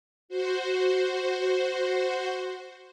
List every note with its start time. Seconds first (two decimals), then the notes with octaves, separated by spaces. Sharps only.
0.29 F#4 C5